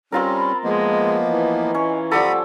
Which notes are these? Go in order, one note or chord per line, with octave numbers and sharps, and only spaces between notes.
G3 C4 C#4 F4 A#4
B5
F3 G#3 A#3 B3 D#5
E3
C#4
F3 G3 A4 F#5 A#5 B5 D#6